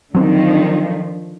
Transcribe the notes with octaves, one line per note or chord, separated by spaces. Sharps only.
D3 D#3 F3 F#3 C4